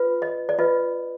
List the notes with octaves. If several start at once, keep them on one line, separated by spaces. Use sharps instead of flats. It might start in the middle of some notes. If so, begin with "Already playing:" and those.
Already playing: F4 B4
D#5
D5
F4 B4 D#5